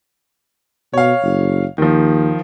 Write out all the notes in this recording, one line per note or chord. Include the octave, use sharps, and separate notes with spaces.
B2 C#5 F5
F#1
D#2 D#3 F3